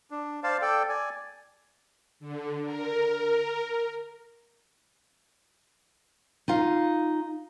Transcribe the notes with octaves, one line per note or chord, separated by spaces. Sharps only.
D4
C5 D5 F5 A5
A4 D5 G5
D5 G#5
D3
A#4
D#4 F4 F5